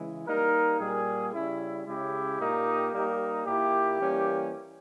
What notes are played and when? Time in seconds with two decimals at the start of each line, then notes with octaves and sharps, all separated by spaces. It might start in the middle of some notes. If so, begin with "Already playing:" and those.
Already playing: C#3 E3 G#3
0.26 G3 A#3 D#4 A#4
0.79 A#2 G3 A#3 G#4
1.32 C#3 G3 C#4 E4
1.86 C#3 G#3 C#4 E4 G4
2.39 A#2 A#3 D#4
2.92 G3 A#3 D#4
3.45 A#2 A#3 E4 G4
3.99 E3 G3 A#3 C#4